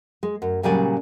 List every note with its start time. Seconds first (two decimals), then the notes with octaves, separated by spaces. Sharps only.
0.23 G#3
0.42 F#2
0.63 A#2 C#3 F#3 G3 D5 G#5